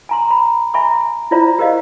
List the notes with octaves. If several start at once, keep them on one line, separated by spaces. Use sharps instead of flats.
G#5 A#5 C6
A#5 B5
E5 G#5 A#5 B5 C#6
E4 F4 C5 D5 E5 A#5
G4 A#4 C5 D5 D#5 F5